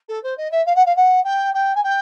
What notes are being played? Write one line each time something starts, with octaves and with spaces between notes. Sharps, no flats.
A4
C5
D#5
E5
F5
F#5
F5
F#5
G5
G5
G#5
G5